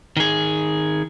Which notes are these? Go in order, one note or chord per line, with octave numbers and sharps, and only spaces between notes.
D#3 G#4